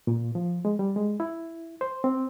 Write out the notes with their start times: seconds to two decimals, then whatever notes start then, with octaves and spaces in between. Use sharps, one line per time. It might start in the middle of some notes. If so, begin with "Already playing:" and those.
0.07 A#2
0.35 F3
0.65 G#3
0.79 G3
0.96 G#3
1.20 E4
1.81 C5
2.04 C4